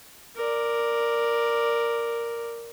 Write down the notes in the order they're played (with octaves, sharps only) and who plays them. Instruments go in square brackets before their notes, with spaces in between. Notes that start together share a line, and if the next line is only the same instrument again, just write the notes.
[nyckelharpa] A#4 D5